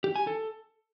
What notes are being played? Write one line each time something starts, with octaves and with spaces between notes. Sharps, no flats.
G4
G#5
A4